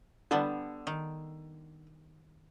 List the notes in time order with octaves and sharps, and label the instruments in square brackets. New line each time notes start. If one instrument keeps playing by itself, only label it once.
[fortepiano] D3 [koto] G3 B3 A5
[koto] D#3